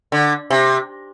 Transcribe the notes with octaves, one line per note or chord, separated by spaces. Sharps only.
D3
C3